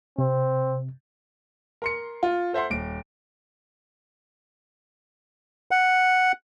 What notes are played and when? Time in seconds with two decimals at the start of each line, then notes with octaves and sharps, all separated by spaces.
0.18 C3 C4
1.82 A#4 C6 C#7
2.23 F4
2.53 A4 C5 E5 F#5 C6
2.70 D#1 D7
5.71 F#5